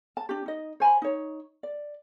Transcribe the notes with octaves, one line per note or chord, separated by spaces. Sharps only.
A5
D4 G4
D#4 D#5
C5 G#5 A#5 B5
D#4 C#5
D5